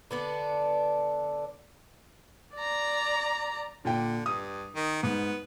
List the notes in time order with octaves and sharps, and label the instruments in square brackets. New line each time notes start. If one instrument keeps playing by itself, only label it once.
[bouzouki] D3 B3 D4
[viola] D5 A#5
[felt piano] A#2 G5 [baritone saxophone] D3
[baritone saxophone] G2 [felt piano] D#6
[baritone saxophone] D#3
[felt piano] G#2 [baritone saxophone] B3